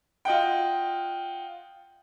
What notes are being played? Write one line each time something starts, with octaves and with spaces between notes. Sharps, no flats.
F4 D#5 F#5 G5